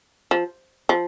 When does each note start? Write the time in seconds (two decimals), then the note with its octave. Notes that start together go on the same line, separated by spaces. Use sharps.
0.31 F3
0.89 F3